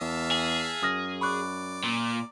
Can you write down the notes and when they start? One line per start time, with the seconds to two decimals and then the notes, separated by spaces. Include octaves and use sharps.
0.01 E2 E5 F5 A5
0.31 G#4
0.83 F#2 D#6 F6 A#6
1.21 D5 B5 C#6 F#6
1.83 A#2